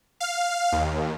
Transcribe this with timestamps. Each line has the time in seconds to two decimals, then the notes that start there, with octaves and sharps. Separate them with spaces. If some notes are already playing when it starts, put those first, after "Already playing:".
0.20 F5
0.72 D#2